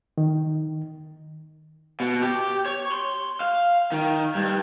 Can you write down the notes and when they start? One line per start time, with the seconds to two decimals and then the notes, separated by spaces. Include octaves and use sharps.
0.18 D#3
2.00 B2
2.22 G4
2.66 C#5
2.92 C6
3.40 F5
3.92 D#3
4.35 G2